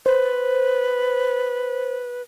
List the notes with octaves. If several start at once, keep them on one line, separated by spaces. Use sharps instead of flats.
B4 C5